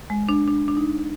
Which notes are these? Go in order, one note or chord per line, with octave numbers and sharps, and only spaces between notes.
G#3
D4
D4
D4
D#4